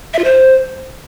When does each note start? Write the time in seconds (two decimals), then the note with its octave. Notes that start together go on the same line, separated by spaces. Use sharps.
0.14 E5
0.19 F4
0.24 C5